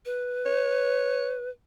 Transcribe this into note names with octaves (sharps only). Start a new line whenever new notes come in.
B4
C#5